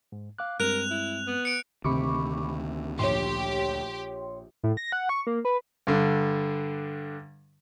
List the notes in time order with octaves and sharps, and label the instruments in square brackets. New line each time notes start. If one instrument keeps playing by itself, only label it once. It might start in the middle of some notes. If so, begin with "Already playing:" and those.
[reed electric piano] G#2
F5 D6 F#6
[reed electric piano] G2 G#3 C4 [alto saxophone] A#4 [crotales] F#6 F7
[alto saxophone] E4
B3
[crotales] C#7 D7
[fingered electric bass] D2 D#3 [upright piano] C3 [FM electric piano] B5 C#6 D6
[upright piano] A#1 [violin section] G4 [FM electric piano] C#5 C6
[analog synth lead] A2
A#6
F#5
C#6
A#3
B4
[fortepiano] G2 D3